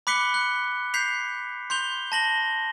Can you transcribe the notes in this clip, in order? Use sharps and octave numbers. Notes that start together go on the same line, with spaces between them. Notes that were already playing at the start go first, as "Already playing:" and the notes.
B5 D6 F#6 B6 C#7 G7
F#6
G6 B6 C7 F7
C6 G6 F7 G7
A5 A#6 F#7 G7